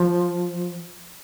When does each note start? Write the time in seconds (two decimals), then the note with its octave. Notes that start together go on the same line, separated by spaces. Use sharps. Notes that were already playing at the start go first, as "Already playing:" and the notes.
Already playing: F3